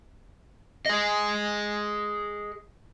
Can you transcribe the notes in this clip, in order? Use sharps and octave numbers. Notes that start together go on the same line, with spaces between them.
G#4 D#5